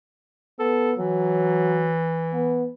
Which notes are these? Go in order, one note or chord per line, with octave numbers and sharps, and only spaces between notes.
B3 A4
E3 F#3
B3